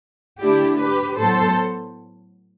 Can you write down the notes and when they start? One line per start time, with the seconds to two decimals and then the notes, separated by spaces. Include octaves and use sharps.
0.40 D3 A3 D4 E4 G4
0.79 G4 B4
1.17 A2 F#3 B3 A4 C5